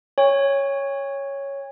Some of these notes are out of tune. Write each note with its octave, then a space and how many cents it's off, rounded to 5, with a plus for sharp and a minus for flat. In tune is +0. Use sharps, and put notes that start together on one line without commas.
C#5 +0 G#5 -45